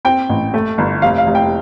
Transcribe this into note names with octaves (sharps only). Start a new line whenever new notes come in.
C4 G5
A1
A3
G1
F1 F5
F5
F1
G5